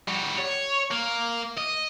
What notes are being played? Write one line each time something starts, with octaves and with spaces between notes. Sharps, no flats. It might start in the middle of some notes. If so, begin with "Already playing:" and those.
G3 F#4
C#5
A#3
D#5